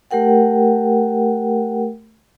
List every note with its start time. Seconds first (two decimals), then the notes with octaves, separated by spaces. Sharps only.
0.11 A3 G4 A#4 F#5 G5